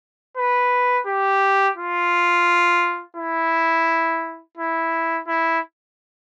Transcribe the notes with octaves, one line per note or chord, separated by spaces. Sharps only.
B4
G4
F4
E4
E4
E4